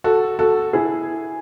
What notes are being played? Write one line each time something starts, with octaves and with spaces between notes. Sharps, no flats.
F#4 A4
F#4 A4
E4 G#4